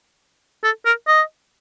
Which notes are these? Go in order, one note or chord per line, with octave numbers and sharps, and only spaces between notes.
A4
A#4
D#5